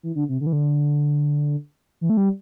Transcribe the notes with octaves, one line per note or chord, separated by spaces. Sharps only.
E3
D3
C3
D3
E3
D3
E3
A3
G3